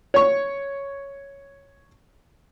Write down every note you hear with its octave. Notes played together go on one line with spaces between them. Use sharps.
C#5 C#6